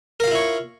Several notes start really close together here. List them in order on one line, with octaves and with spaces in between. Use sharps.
A#4 F5 F4 E4 C#5